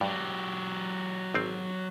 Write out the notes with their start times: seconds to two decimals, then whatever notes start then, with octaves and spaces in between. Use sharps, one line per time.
0.01 G2 F#3 G4
1.34 G#1 C4